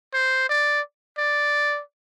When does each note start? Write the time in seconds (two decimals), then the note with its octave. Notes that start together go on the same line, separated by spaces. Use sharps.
0.13 C5
0.49 D5
1.18 D5